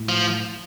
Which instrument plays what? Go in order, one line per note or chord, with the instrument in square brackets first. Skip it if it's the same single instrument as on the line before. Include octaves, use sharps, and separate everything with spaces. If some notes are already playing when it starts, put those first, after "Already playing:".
Already playing: [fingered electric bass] A2
[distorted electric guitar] F3